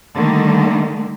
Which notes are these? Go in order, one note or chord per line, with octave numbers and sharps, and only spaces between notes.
D3 D#3 G3 A3 A#3